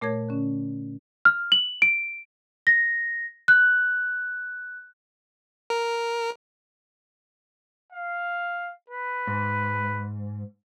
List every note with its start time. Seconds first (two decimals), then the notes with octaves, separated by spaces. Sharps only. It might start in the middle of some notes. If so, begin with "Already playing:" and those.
0.01 A#2 A3 A#4 C#5 G#6
0.29 D3 C#4
1.25 F6
1.52 F#7
1.82 D7
2.67 A#6
3.48 F#6
5.70 A#4
7.92 F5
8.89 B4
9.27 G#2